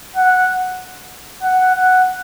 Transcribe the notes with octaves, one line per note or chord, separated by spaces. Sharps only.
F#5
F#5
F#5